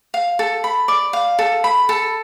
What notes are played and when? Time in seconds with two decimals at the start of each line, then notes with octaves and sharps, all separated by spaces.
0.14 F5
0.39 A4
0.64 B5
0.88 D5
1.13 F5
1.39 A4
1.64 B5
1.89 A4